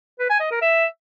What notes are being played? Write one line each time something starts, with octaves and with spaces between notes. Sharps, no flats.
B4
G#5
D#5
A#4
E5